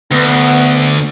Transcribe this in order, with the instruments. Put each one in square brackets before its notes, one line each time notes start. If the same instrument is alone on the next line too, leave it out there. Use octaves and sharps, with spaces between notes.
[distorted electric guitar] D2 [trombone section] B3